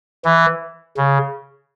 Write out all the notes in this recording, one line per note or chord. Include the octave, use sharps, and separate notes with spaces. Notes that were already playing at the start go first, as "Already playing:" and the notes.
E3
C#3